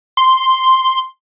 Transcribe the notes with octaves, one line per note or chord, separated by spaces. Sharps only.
C6